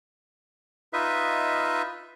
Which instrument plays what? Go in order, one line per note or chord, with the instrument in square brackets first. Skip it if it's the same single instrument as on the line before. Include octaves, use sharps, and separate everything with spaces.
[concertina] D#4 F4 B4 D#5 E5